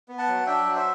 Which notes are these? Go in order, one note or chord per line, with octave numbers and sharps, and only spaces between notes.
B3
F#5 A5
F#3
D4 E5 G5
F#3
C5 E5